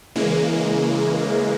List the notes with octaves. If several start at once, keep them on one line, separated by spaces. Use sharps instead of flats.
C#3 E3 G#3 A#3